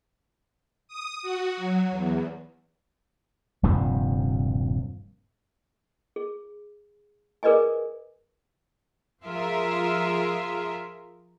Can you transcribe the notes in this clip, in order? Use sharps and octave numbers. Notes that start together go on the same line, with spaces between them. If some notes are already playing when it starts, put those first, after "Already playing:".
D#6
F#4
F#3
E2
D#1 G2 C3 F3
G#4
G#4 A#4 B4 D5 D#5 G#5
F3 F4 G#4 A#4 E5